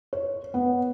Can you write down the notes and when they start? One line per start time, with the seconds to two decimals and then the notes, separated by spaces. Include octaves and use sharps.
0.13 C#5
0.54 B3